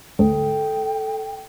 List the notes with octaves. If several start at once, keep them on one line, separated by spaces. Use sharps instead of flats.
G#1 D2 A4 G5